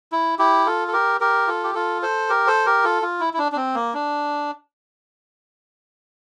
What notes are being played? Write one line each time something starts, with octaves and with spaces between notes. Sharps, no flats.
E4
E4 G4
F4 A4
A4
G4 A#4
G4 A#4
F4 A4
G4
F4 A4
A4 C5
G4 A#4
A4 C5
G4 A#4
F4 A4
F4
E4
E4
D4
D4
C4
A#3
D4